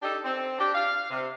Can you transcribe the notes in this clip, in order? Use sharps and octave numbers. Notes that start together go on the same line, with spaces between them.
D4 D#4 G4 A4 D#5
C4
D4 G4
F5
C3